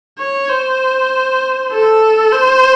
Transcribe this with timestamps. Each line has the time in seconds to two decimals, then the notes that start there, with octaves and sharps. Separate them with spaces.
0.19 C#5
0.49 C5
1.72 A4
2.32 C5